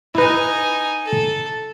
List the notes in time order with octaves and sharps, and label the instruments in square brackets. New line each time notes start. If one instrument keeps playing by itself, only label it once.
[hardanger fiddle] D#4 G#5 [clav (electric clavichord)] E4 B4
[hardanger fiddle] A4